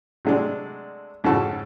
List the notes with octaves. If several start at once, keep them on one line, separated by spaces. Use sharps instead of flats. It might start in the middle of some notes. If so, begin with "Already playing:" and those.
C3 F#3 G#3 A3 D4
F2 G#2 C#3 F#4 A4 C#6